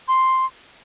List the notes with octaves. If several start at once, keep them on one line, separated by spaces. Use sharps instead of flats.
C6